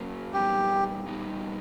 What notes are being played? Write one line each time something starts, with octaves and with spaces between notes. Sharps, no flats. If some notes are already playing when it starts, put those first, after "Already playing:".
Already playing: F#3 A#3 C#4
A#2 G3 B3 D#4 G4
A#2 G3 B3 D#4